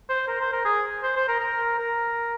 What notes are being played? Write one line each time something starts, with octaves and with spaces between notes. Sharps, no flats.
C5
A#4
C5
A#4
G#4
C5
C5
A#4
A#4
A#4